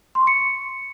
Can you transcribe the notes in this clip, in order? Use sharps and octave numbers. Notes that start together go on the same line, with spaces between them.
C6
C#6
C#7